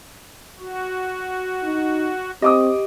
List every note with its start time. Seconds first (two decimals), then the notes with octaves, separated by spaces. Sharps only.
0.59 F#4
1.63 D#4
2.42 C4 G4 D#5 D6 D#6